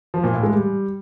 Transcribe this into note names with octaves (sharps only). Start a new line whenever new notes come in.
F3
A#2
A2
G#3
G3